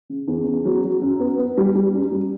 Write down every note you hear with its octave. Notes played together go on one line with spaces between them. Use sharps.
C#3
E2
C#3
F#3
F#3
F#2
B3
B3
G3
G3
F#2
G3